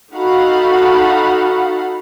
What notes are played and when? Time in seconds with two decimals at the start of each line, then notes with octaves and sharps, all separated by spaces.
0.13 D#4 F#4 A4 F5 F#5 B5